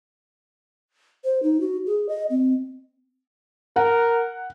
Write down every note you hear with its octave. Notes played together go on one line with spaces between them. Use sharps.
C5
D#4
F#4
G#4
D#5
C4
A#4 F#5